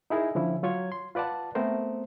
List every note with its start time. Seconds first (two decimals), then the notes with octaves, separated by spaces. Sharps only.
0.10 D#4 E4 G#4 A#4
0.35 D3 F3 C#4 E4
0.63 F#3 F4 C#5 G#6
0.92 C6
1.15 F4 B4 D5 F#5 A5
1.55 A3 B3 C4 A#4 C5